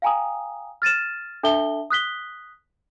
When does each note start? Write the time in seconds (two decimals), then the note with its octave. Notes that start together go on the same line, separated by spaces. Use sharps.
0.02 F5 G5 G#5 A#5 D#6
0.82 F6 A6 D#7 E7
1.43 D4 A4 E5 A5 G7
1.90 D#6 F#6 B6 G7